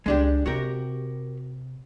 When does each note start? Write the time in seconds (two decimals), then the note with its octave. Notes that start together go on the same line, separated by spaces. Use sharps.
0.06 C#2 G#3 D4 G4
0.46 C3 F#4 G4 A#4